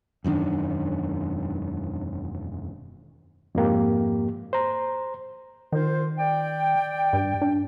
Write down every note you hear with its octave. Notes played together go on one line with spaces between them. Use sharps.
E1 F#2 D#3 D4
F2 G#2 A#3 G4
C5 A#5
D#3 F4 A#4 C5
D5 G5
G2
D4